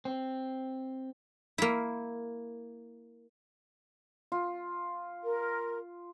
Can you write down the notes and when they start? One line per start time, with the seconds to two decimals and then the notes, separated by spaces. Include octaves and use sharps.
0.05 C4
1.58 A#3 E4
4.32 F4
5.23 A#4